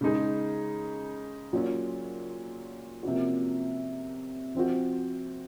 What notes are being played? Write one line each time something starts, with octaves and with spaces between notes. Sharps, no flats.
C#3 G#3 D#4 G#4
A#2 F#3 C#4 F4
C3 F3 A#3 C#4 F#4
F3 C4 F#4